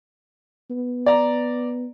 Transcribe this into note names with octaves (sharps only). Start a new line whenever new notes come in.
B3
D5 A#5